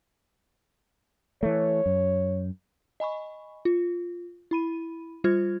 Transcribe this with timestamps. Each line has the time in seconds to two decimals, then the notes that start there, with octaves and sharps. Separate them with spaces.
1.43 E3 A3 C#5
1.86 F#2
3.00 D#5 G#5 B5 C#6
3.65 F4
4.51 E4 B5 D#7
5.24 G3 F4 C5 F6 G#6